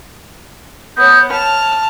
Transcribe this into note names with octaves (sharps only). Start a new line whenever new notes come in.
B3 C#5 D#6 G6
C#5 A5 F6